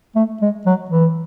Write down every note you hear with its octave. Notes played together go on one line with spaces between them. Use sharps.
A3
G#3
F#3
E3